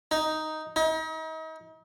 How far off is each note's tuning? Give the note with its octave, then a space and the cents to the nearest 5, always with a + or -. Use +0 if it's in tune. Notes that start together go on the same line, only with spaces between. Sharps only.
D#4 +5
D#4 +40